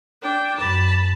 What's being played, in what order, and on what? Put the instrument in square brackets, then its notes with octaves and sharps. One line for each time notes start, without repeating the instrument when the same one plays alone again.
[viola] D4 G5
[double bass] F#2 [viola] A5 B5